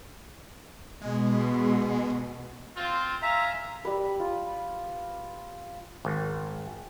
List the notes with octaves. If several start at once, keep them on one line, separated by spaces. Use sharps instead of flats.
B2 G#3
C4 F4
E5 F5 G#5 A#5
G3 B4
F4
G#1